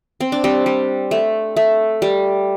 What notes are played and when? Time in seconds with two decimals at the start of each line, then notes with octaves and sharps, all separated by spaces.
0.21 C4
0.32 D4
0.44 G3 C4
0.66 G3
1.11 A3
1.57 A3
2.02 G3